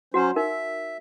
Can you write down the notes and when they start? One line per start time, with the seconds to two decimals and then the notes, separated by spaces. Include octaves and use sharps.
0.14 F#3 C#4 F#4 C5 F#5 A#5
0.36 D#4 A#4 E5